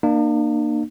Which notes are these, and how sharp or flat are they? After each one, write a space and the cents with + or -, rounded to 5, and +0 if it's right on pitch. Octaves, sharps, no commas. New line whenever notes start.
A#3 +0 D4 +45